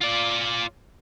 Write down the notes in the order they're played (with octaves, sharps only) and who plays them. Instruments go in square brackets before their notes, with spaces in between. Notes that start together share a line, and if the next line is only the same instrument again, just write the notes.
[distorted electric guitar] F4 D5